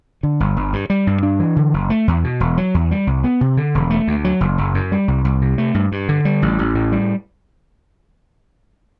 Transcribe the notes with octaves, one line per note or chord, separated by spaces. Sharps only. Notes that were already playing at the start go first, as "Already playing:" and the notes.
D3
G1
G1
G2
G3
G2
D4
E3
D3
F#1
A3
E2
B2
E1
F#3
E2
G3
C2
B3
C3
D3
E1
A3
D2
F#3
F#1
F#1
F#2
G3
C2
C2
C3
A3
G2
G2
D3
G3
A1
A1
A2
G3